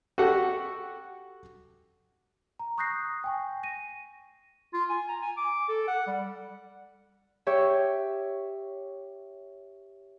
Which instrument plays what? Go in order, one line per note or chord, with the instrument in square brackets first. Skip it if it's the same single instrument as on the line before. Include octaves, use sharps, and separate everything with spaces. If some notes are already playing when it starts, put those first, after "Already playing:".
[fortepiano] F#4 G4 A4 F#5
[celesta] A#5
C#6 D#6 F#6 G6 A#6 C7
G5 G#5 C#6
A#6 D#7
[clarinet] F4
G#5
A#5
G#5
D6
A4
F#5
G3
[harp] G4 C#5 E5